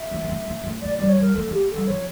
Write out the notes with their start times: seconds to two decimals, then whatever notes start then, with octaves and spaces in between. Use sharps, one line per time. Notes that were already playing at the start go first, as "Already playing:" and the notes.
Already playing: E5
0.11 A3
0.21 A#3
0.29 A3
0.47 A#3
0.64 A3
0.82 A3 D5
0.95 G3 D5
1.09 C#5
1.17 G3 A#4
1.35 A3 A4
1.48 A#3 G4
1.70 G3 A4
1.87 F3 C#5